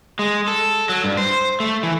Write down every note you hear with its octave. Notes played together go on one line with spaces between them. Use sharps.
G#3
A4
F#3
G2
C5
A3
E3